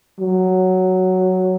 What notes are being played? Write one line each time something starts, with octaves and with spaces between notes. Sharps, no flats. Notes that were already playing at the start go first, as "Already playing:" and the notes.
F#3